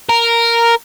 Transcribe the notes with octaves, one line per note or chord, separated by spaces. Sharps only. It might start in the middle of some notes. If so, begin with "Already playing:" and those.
A#4